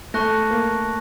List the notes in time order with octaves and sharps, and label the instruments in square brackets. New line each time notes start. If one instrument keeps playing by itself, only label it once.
[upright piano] A3 [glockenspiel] A5 C#6 F#6 A#6
[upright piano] A#3